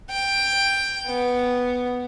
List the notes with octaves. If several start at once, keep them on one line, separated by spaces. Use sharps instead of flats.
G5
B3